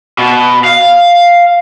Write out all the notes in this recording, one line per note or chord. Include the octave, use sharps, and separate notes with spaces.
B2
F5